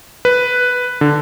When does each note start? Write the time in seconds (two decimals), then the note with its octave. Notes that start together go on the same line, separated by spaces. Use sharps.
0.25 B4
1.01 D3